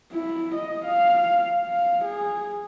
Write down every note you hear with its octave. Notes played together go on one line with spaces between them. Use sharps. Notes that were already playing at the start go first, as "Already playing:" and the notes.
E4
D#5
F5
F5
G#4